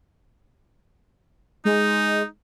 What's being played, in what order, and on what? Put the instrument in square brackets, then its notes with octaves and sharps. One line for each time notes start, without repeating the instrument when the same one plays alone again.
[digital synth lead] G#3 [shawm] D#4